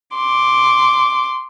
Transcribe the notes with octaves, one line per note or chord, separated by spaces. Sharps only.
C6 D6